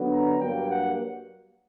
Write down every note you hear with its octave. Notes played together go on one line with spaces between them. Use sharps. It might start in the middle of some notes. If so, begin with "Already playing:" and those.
Already playing: D3 F#3 B3 D4
A#5
G2 F#3 A#3 G5
F#5